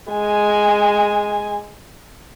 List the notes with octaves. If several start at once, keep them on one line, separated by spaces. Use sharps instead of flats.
G#3 G#5